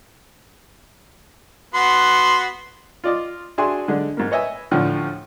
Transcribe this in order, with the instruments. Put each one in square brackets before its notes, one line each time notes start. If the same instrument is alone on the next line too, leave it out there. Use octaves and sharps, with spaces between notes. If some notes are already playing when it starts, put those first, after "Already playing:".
[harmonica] B3 F#4 C6
[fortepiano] F4 D5 D#5
D4 F#4 G#4 E5 G#5 C6
D3 G#3 D4
G#2 A#3
B4 C#5 D#5 E5 G#5
D2 A2 D3 F3